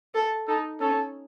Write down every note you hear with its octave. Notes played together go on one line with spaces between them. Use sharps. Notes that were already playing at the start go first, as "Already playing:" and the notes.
A4
D#4 A4
C#4 A4